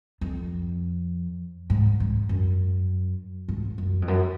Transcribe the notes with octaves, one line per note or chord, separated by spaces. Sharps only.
F2
G#2
G#2
F#2
G#2
F#2
F2
F#2